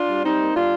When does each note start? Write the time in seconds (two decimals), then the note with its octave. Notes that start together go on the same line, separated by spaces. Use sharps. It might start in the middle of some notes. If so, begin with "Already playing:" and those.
Already playing: D4 F4
0.10 G3
0.24 G3 C4 D#4
0.39 A#3
0.54 G3 D4 F4